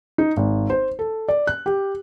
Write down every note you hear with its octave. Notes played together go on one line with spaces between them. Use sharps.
D#4
G#1
C5
A4
D5
F#6
G4